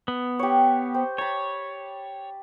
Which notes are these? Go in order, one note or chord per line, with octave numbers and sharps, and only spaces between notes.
B3
G4 C#5
C5 G5
C#5 A5 B5